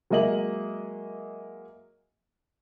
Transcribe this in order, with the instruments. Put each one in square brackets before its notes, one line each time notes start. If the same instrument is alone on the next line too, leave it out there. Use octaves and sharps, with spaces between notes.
[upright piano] F#3 G#3 A#3 D#5 E5 F#7